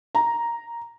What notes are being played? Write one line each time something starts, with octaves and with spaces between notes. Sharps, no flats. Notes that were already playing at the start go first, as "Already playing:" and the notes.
A#5